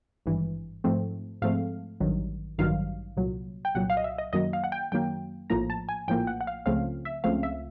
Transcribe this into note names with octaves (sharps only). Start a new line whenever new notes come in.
G#1 G2 E3
G#2 F3 A3 C4
G#2 F3 A3 C4 F5
A1 G2 D#3 F#3
A1 G2 D#3 F#3 F5
C2 A#2 F#3
G5
C2 A#2 F#3 F#5
F5
D#5
E5
D#5
F#2 D#3 F#3 A#3 D#5
F5
F#5
G5
F#2 D#3 F#3 A#3 G5
A#1 A2 F3 A#3 A#5
A5
G#5
A#1 A2 F3 A#3 G5
F#5
F#5
F5
C#2 C#3 F3 A3 C4 F5
E5
C#2 C#3 F3 A3 C4 F5
E5